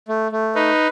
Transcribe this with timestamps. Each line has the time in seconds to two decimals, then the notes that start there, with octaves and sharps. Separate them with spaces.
0.08 A3
0.32 A3
0.55 D#4 B4